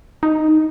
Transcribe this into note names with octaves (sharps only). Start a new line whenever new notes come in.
D#4